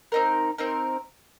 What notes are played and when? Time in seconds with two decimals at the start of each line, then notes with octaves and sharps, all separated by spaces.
0.12 C4 D#4 A#4
0.58 C4 D#4 A#4